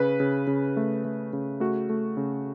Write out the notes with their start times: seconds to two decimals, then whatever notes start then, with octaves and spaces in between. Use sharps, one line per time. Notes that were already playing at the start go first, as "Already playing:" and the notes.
Already playing: C#3 B4
0.20 C#3
0.47 C#3
0.77 A3
1.05 A3
1.33 C#3
1.60 A3 F#4
1.89 A3
2.17 C#3